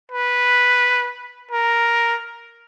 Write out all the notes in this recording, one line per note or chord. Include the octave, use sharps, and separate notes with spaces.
B4
A#4